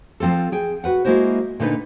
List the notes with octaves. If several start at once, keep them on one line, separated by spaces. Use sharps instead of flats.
F3 C4 F4 A4
G#4 G5
F#4 B4 F#5
G#3 A#3 E4 F#4 C5
A#2 D3 D#4 B4